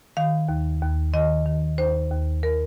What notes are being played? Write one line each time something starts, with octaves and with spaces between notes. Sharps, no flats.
D#3 F5
D#2
D#2
D#3 D#5
D#3
D#2 C5
D#2
A#4